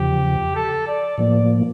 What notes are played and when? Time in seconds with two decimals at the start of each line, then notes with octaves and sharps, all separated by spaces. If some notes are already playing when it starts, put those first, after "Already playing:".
Already playing: E2 C#3 F3 G4
0.55 A4
0.87 D5
1.18 A2 F3 A#3 D5